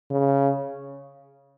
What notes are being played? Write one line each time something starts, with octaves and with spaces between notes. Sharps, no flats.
C#3